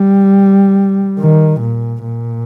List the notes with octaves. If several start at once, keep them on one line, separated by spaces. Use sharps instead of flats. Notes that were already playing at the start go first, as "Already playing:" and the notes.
Already playing: G3
D#3
A#2
A#2